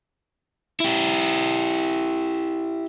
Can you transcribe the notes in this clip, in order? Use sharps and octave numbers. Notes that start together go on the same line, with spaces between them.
E4 G4